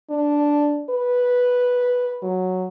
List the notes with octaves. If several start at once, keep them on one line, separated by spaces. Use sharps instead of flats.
D4
B4
F#3